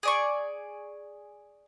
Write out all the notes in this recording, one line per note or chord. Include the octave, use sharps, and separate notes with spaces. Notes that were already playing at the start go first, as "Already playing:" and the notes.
G#4 D5 C#6